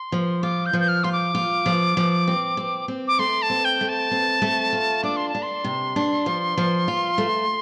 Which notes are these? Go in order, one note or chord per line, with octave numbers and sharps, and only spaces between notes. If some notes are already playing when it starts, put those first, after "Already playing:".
Already playing: C6
F3
F4 D6
G6
F3
G6
F6
F4 C6
D6
F4
F3
F3
C4
C4
C4
D6
A3 C6
A5
C4
G5
A3
A5
C4
A3
F4
D4 D6
C6
A5
D4
C6
C3
D4
F3
F3
F4
A3